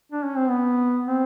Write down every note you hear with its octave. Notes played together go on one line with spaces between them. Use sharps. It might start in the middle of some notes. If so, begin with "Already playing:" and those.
D4
C#4
C4
B3
C4